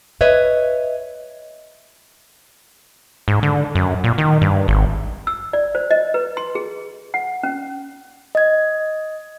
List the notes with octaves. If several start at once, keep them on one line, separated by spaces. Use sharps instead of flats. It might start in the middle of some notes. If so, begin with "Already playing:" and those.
B4 C#5 D#5 E5
G#2
D3
F#2
A#2
D#3
G2
G#1
E6
D5
C5
D#5
B4
C6
G#4
F#5
C#4
D#5 G#6